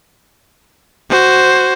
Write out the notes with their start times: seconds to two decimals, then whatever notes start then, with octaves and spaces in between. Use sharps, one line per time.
1.10 F#4 C5